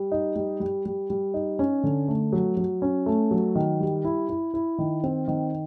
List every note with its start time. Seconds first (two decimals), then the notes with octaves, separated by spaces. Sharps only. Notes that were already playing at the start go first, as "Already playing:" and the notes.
Already playing: G3
0.12 D#4
0.36 G3
0.60 G3
0.85 G3
1.10 G3
1.34 D#4
1.59 C#4
1.84 D3
2.08 A3
2.33 F#3
2.57 F#3
2.82 C#4
3.06 A3
3.31 F#3
3.55 D#3
3.80 G3
4.05 E4
4.29 E4
4.54 E4
4.78 D#3
5.04 C4
5.28 D#3